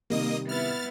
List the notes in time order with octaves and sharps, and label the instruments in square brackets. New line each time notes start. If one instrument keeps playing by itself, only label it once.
[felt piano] C3 D#3 G3 [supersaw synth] A#3 D#5 D#6
[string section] B3 E4 E5 [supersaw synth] F6 A6